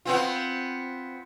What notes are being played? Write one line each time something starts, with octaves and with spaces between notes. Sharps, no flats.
B3 C4 F4